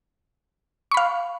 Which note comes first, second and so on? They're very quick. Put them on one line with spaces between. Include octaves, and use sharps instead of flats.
C#6 B5 F5